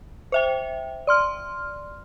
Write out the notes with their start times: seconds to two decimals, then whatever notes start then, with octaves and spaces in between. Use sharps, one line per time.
0.32 C5 E5 G5
1.07 D5 C6 F6